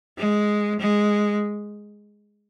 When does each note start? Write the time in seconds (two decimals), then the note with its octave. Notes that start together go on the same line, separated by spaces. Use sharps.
0.18 G#3
0.80 G#3